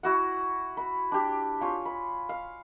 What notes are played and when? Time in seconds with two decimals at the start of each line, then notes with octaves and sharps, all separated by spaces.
0.03 E4 F#4 F#5
0.77 B5
1.12 D4 G4
1.61 F4 C#5 G#5
1.85 B5
2.29 F5